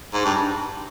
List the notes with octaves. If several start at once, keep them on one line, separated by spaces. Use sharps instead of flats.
G#2
G2